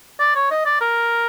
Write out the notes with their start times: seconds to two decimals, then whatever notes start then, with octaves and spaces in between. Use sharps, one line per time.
0.20 D5
0.35 C#5
0.51 D#5
0.66 D5
0.81 A#4